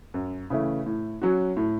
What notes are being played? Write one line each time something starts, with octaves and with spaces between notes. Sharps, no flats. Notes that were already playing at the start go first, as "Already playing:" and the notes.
F#2
C#3 E3 A3 E4
A2
F#3 C#4 F#4
A2